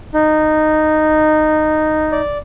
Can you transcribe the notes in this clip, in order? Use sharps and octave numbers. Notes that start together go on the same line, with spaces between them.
D#4
D5